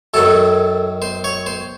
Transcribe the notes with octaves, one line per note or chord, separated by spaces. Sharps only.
F#2 D#3 F#3 A4
C5
C#5
C5